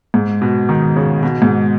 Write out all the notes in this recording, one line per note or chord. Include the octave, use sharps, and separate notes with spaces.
G#2
B2
D#3
C#3
B2
G#2